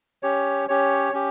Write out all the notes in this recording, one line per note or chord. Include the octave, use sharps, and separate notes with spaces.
C#4 G4 C#5
C#4 G4 C#5
C#4 G4